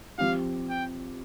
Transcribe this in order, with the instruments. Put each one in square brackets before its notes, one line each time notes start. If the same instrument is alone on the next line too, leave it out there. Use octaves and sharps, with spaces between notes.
[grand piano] F3 C4 G4 [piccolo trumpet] F5
[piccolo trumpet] G5